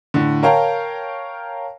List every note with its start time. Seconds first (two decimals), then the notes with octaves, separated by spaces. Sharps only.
0.14 A2 D3
0.43 A#4 C#5 F5 G5 A5 A#5